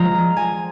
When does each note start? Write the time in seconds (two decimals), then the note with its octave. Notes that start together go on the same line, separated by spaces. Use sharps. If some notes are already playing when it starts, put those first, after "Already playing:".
Already playing: F3 G#3 F4 A#5
0.37 G#5